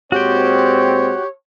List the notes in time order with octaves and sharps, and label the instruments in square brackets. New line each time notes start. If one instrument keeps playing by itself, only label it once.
[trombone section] A#2 G#3 C4 [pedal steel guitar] F#4 G5 [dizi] G4 [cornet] C#5